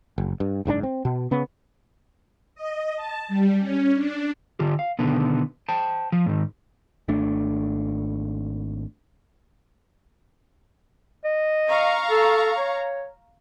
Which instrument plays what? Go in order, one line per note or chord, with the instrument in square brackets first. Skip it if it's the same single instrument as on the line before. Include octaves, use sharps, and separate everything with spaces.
[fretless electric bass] F#1
G2
F#1 G#2 B2 D4
C4
B2
C#3 B3
[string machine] D#5
A5
G3
C#4
D4
[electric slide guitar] D3 F4 G4
F5
B2 D3 D#3 B3
C5 G5 A5
F3
G#2 D#3
[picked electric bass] G#1 A3 D4
[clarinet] D#5
[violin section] F5 A#5 C#6
[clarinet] A4
C#5